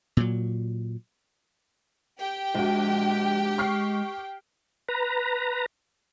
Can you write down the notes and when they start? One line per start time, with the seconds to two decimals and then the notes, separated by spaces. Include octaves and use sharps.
0.17 A#2 F#3
2.19 G4 G5
2.55 A#1 G#3 F#4
3.58 C#6 F6 C7
4.89 B4 A#5